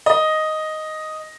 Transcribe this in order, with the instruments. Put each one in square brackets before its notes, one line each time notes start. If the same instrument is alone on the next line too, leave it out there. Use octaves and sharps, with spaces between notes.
[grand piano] D#5